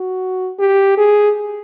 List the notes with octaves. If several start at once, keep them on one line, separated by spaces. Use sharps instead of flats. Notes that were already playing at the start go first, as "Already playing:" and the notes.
Already playing: F#4
G4
G#4